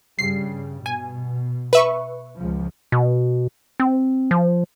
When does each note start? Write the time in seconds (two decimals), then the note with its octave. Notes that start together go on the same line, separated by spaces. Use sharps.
0.19 G2 C#3 G3 C7
0.86 B2 G#5
1.73 B4 E5 C#6
2.36 C#2 F3
2.92 B2
3.80 C4
4.31 F3